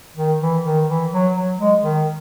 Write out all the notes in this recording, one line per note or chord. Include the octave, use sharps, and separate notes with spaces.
D#3
E3
D#3
E3
F#3
F#3
G#3
D#3